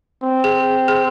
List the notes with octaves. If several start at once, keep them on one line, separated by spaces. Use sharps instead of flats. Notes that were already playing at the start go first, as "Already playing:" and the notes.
C4
G#4
G#4